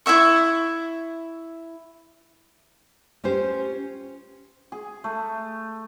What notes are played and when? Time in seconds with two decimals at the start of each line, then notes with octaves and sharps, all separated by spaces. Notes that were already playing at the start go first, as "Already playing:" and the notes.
0.06 E4 F#4 E5 C#6
3.24 C#4 F4 G4 C5
4.72 G#4
5.04 A3